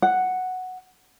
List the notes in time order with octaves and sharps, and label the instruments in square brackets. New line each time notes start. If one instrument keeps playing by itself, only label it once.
[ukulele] F#5